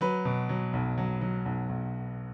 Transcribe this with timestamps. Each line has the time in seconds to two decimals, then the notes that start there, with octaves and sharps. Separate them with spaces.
0.01 F#3 B4
0.25 B2
0.49 F#3
0.73 B1
0.98 F#3
1.21 F#3
1.46 B1
1.69 B1